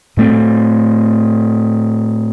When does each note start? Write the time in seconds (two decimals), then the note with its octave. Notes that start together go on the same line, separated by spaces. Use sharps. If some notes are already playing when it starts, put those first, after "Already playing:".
0.17 A2 A3 C4